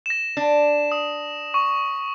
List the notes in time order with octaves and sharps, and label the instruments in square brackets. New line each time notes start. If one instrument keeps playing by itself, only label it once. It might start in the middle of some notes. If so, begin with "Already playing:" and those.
[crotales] A#6 E7
[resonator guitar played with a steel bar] D4
[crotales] D#6
C#6